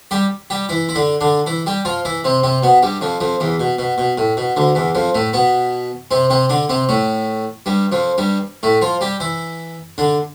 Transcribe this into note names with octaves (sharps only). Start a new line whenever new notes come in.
G3 G4
G3 G4
E3 E4
E4
D3 D4
D3 D4
E3 E4
G3 G4
F3 F4
E3 E4
C3 C4
C3 C4
B2 B3
G2 G3
F2 F3
F2 F3
E2 E3
B2
B2
B2
A2
B2
D2 D3
E2 E3
F2 F3
A2 A3
B2 B3
C3 C4
C3 C4
D3 D4
C3 C4
A2 A3
G2 G3
F2 F3
G2 G3
A2 A3
F3 F4
G3 G4
E3 E4
D3 D4